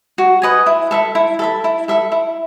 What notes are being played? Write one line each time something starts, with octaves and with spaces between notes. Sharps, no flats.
F#4
B4 D#5 G#5
E4
A4 E5 B5
E4
A4 E5 B5
E4
A4 E5 B5
E4